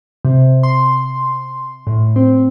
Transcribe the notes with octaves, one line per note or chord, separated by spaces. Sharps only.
C3
C6
A2
C4